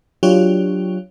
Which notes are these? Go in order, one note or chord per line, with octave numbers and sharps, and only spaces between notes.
F#3 D4 F4 G4 C#5